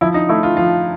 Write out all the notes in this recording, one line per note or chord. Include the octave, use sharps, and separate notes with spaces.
F3 E4
D#4
A3 E4
F4
F3 F4